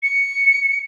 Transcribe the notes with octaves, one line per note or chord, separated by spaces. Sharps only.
C#7